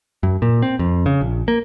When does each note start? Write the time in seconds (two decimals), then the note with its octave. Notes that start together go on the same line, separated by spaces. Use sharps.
0.23 F#2
0.42 A#2
0.62 C4
0.79 F2
1.06 C#3
1.21 A#1
1.48 A#3